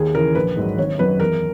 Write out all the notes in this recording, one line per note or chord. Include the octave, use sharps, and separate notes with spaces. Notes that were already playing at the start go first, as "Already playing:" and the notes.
Already playing: D#2 G#4
C#3 E3 A#4
A#1 B4
G#2 F#3
G#1 C#5
F#2 D#3 F#3 B4
E2 A#4